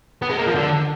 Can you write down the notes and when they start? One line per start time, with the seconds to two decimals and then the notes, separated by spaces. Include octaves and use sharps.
0.22 B3
0.30 G#3
0.38 A#3
0.47 F3
0.55 D3